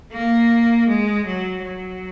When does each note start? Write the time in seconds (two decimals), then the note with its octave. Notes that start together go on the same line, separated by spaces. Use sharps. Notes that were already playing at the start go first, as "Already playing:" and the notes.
0.13 A#3
0.89 G#3
1.26 F#3
1.64 F#3